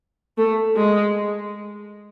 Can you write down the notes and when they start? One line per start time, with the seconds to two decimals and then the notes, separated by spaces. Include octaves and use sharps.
0.38 A3
0.77 G#3